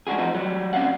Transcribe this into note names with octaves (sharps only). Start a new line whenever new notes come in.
G#3 D4 F4 F#4 G#4
F3 C4 D#4 F#4
F#3 G3
C4 C#4 D5 F5 F#5